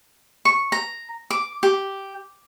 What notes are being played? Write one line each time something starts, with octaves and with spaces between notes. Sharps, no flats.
C#6
A#5
D6
G4